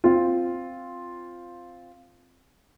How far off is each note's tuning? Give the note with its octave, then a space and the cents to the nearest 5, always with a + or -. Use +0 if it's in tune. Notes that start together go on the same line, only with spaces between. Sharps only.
C4 +0 F4 +0